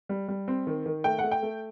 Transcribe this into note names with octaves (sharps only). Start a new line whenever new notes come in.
G3
G3
C4
D#3
D#3
A3 G5
F#5
A3
G5
A3